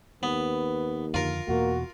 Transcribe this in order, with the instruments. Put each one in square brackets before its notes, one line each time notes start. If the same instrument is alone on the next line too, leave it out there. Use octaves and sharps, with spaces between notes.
[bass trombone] D#2 [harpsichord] B3 [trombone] B4
[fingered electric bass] F2 D3 [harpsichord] F4 A#4
[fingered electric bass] E2 B2 [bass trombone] A#3 [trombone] F#4